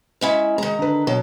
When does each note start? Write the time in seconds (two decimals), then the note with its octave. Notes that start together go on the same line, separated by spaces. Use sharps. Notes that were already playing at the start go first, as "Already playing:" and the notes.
0.21 G#3 C#4 E4
0.58 D#3 G#3 A#5
0.79 D3 B4
1.07 B2 F#3